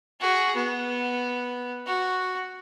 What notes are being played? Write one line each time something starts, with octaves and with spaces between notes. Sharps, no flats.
F#4 G#4
B3
F#4